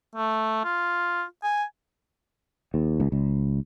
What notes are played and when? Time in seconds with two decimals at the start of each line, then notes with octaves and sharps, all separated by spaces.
0.15 A3
0.64 F4
1.43 G#5
2.74 D#2
3.00 C#2
3.12 C#2